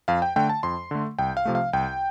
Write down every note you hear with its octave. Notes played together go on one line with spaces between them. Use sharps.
F2 F5
G5
D3 A3 G5
A5
F2 C6
D3 A3
C2 G5
F5
C3 F3 A3
F5
C2 G5